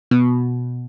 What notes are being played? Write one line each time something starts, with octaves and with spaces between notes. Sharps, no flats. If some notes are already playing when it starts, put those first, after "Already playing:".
B2